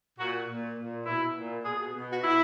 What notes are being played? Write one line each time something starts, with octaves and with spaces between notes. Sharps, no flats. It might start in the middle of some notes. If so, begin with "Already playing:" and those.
A#2 F#4
A#2
A#2
B2 E4
A#2
B2 G#4
G#4
B2
F#4
B2 E4